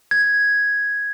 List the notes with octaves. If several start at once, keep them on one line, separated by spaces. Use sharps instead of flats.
G#6